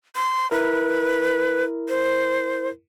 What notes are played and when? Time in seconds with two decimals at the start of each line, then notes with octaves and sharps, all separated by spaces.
0.16 C6
0.51 E4 A#4 B4
1.89 C5